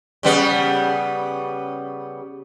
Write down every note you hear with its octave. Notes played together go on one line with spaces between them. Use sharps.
C#3 G3 B3